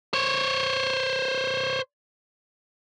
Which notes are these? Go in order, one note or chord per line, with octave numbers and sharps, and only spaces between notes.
C5 C#5